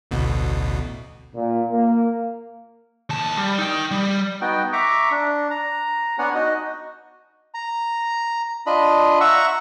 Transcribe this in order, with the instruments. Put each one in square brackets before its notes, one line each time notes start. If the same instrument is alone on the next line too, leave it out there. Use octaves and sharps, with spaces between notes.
[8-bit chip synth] A1 D2 B2
[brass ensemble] A#2
A#3
[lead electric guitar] D#2 A5
G3
D#4 G5
G3
[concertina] B3 D#4 F#4 G5
E5 A#5 C#6 D6
D4
A#5
B3 D4 C#5 F#5 G#5
D#4 F#4 D#5
A#5
D4 F4 D#5 B5
E5 F#5 A#5 C#6 E6